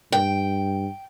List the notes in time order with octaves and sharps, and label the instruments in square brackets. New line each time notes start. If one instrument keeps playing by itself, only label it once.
[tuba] G2 [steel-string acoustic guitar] G5